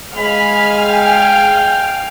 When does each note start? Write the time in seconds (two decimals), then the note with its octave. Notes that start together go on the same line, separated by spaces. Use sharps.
0.16 G#3 F5 G#5 B5 F6
0.81 G5